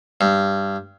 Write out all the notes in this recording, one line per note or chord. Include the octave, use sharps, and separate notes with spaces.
G2